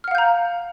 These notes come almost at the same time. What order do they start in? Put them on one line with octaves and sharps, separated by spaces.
F6 F#5 F5 G6 A#5